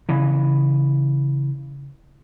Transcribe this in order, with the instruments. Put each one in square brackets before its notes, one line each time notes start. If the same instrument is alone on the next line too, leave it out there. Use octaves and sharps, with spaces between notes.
[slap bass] C#3 E3